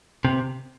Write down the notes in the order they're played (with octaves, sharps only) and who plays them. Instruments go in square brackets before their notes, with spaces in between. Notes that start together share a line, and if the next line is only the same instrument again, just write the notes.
[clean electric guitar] C3